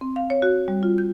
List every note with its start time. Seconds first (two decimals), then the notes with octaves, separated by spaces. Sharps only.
0.01 C4
0.16 F5
0.30 C#5
0.42 F#4
0.68 G3
0.83 F4
0.98 G6